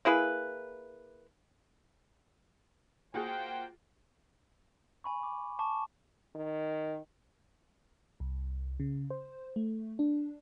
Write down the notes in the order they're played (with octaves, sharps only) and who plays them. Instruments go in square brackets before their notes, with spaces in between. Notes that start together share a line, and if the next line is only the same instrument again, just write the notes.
[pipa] A#3 E4 G#4 B4
[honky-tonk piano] A#3 F4 F#5 [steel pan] F#4 G#4 [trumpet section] C5 G5
[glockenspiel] G#5 B5 C#6
D6
A5 C#6 D6
[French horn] D#3
[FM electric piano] C2
C#3
C5
A3
D4